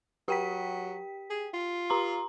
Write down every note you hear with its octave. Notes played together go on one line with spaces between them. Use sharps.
F#3 G4 G5 B6
G#4
F4
G4 A#5 C6